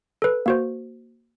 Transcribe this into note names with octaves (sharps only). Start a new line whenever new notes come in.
A4 B4
A#3 F#4 C5